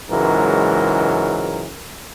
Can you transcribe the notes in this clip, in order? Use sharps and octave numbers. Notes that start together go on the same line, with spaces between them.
C#2 G#2 E3 F#3 A#4